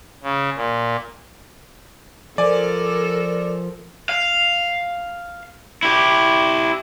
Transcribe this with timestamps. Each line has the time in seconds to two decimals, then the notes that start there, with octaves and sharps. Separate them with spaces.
0.23 C#3
0.55 A#2
2.38 F3 A4 A#4 D5 G#5
4.09 F5
5.83 E4 G4